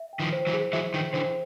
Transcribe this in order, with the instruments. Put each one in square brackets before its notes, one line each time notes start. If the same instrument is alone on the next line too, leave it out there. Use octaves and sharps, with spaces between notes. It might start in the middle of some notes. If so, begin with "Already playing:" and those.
Already playing: [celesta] E5
G5
[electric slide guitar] D#3 F3
[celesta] C5
[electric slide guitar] E3 F#3
[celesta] G#4
[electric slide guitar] E3 F#3 [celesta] E5
[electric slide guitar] D#3 F3 [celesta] G5
[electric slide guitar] D3 E3 [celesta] C5